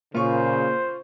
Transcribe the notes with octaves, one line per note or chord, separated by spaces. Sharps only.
A#2 C#3 A#3 F4 C5 C#6